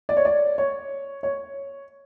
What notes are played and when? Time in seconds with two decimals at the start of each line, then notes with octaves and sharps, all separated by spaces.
0.09 D5
0.17 C#5
0.25 D5
0.58 C#5
1.23 C#5